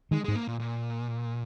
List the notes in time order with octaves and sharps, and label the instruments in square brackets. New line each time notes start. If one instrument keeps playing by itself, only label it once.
[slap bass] D#3 [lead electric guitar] G#3
[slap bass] G#2 [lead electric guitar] G#3
[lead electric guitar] A#3
A#2
A#2